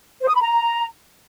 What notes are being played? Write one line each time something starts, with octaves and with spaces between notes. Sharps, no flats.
C5
D#6
B5
A#5